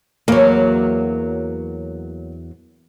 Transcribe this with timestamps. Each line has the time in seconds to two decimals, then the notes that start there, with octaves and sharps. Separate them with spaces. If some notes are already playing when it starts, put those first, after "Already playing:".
0.28 E2 F#3 A#3